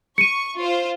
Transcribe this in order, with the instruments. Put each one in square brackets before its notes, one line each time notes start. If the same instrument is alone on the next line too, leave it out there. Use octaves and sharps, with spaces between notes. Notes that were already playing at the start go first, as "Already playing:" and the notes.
[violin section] C#6 [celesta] C#7 D#7
[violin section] F4 C5